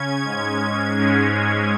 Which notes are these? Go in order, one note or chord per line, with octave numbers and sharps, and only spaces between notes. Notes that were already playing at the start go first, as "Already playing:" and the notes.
Already playing: C#3 C#4 G#6
G#2 G#3 C#4 G#6
G#2 G#3 C#4